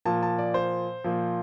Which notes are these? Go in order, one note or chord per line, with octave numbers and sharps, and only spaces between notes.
A#2 F3 A5
A5
D5
C5
A#2 F3